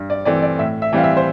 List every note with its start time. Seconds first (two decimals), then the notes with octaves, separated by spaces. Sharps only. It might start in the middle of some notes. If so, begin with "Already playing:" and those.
Already playing: G2
0.10 D5
0.25 E3 A3 C4 D5
0.42 D5
0.59 A2 E5
0.82 E5
0.93 E3 G3 C4 F5
1.04 E5
1.17 C5